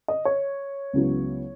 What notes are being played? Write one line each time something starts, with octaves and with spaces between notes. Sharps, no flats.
D#5
C#5
C#2 C#3 F#3 B3 E4